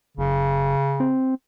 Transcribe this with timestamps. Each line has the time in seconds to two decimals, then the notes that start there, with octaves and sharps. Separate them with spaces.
0.17 F#1 C#3
1.00 C4